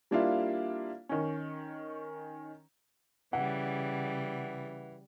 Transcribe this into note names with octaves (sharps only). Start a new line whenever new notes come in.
G3 A#3 D4 E4 F4 F5
D#3 C#4
C#3 E3 G3 F#5